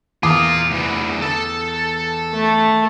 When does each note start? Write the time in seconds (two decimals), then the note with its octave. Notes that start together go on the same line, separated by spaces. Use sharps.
0.23 E2 F4 A#4 D6 D#6
0.70 D2 E3
1.22 A4 A5
2.34 A3